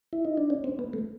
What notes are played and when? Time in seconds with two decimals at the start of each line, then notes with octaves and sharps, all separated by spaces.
0.13 E4
0.25 D#4
0.37 D4
0.50 C#4
0.64 C4
0.79 B3
0.93 A3